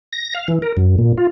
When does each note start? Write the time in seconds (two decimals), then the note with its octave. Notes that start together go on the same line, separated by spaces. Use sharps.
0.13 A#6
0.35 F5
0.48 E3
0.62 A#4
0.77 F#2
0.98 A#2
1.18 F4